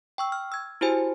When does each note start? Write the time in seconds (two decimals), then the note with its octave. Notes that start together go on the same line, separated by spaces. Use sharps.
0.18 G5 C#6 E6
0.32 F6
0.52 E6 G#6
0.81 E4 F#4 G4 C5 G#5